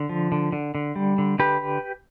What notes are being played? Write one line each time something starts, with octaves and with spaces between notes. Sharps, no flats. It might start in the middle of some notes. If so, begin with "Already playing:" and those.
Already playing: D3
F3
D3
D3
D3
G3
D3
D3 G4 B4